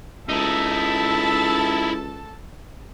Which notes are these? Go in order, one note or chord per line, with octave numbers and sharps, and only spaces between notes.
C#2 D#4 E4 A4 E5 A5